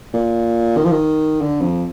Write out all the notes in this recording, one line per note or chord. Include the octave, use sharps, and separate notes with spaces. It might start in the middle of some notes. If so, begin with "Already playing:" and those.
A#2
D#3
F3
D#3
D3
F2